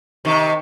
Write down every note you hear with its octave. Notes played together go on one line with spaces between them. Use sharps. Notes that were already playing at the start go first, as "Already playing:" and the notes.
C3 D#3